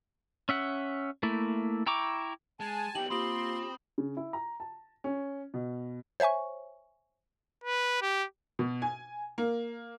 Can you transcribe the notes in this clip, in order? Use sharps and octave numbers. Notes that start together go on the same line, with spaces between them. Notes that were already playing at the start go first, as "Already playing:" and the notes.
C#4 E5 F#5
A3 A#3 E4
E4 G5 A#5 C#6 D6
G#3 G#5 A5
B3 D#4 G4 G5 F#7
A#3 C4 F4 G4 B5 C6 D#6 F#7
C#3
E4
A#5
A5
C#4
B2
C5 C#5 E5 G#5 C#6
B4
G4
B2
G#5
A#3